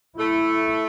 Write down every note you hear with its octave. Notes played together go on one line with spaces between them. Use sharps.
A3 E4